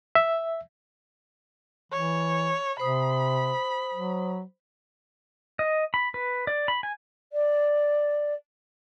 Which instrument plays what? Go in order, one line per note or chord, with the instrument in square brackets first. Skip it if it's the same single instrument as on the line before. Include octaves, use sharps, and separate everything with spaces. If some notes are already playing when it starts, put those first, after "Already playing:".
[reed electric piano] E5
[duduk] E3 [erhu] C#5
[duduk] C3 [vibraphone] C5 D#6 [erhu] B5
[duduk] F#3
[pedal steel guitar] D#5
B5
B4
D5
B5
G#5
[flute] D5